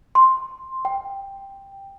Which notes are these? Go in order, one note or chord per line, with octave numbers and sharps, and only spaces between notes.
C6
G5